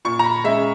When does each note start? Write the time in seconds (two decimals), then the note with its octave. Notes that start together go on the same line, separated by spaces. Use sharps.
0.05 A#2 C#6
0.19 A#5
0.24 B5
0.44 G#3 C#4 E5